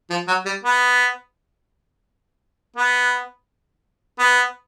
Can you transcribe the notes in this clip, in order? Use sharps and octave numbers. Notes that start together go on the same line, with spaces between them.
F3
F#3
G3
B3
B3
B3